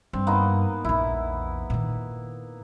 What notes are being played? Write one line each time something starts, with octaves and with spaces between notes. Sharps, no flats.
G2 C4
A#3 B3 D#4
A#1 E2 E4
A#2 D#3